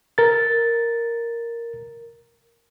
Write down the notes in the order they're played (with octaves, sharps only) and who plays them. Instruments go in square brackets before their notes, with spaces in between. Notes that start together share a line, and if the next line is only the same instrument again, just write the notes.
[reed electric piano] A#4 A6